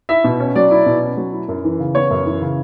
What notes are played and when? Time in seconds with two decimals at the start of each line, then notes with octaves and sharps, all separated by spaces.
0.09 E4 E5
0.24 B2
0.40 C#4
0.56 F#3 D5
0.71 E4
0.86 B2
1.02 C#4
1.17 F#3
1.33 E4
1.49 F#2
1.64 E3
1.79 C#3
1.95 B3 C#5
2.11 F#2
2.26 E3
2.41 C#3